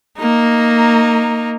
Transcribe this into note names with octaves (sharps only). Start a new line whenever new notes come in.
A#3 D#4